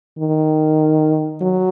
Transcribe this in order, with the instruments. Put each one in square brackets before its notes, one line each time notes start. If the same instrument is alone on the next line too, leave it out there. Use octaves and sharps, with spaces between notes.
[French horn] D#3
F#3